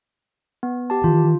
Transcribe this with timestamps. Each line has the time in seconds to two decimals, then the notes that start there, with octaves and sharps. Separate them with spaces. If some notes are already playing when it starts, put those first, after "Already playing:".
0.63 B3
0.90 G4 A5
1.04 D#3 E3 F4